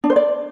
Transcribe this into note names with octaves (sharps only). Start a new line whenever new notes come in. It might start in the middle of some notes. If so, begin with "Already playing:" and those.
D4
C5
D5